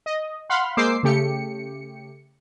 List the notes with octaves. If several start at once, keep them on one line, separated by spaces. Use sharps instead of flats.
D#5
F5 F#5 B5 C6 F6
G#3 A#3 C5 D6 E6 C7
C#3 A3 G4 C#7